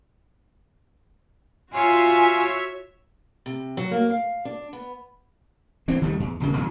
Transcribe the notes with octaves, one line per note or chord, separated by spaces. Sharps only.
F4 F#4 C#5 E5 G#5
C3
F#3
A#3
F5
D4
B3
E3 C4
D#2 D#3 G3 A3
E2
D#1 C#3 A#3
E2 E3 F#3